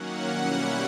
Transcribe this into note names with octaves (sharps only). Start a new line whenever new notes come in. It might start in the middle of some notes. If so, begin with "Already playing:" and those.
Already playing: D#3 F#3 A#3 C#4 F#5
B2 G3 A#3 C#4 E4